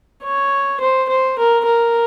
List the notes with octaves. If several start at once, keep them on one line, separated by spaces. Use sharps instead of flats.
C#5
C5
C5
A#4
A#4